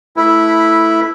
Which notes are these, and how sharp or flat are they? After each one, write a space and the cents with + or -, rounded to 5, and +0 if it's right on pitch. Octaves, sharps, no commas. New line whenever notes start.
A3 +0 E4 +0 B4 -10